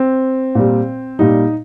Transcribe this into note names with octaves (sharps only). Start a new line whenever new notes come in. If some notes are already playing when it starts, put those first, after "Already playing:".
Already playing: C4
A#2 G3
A#2 G3 D#4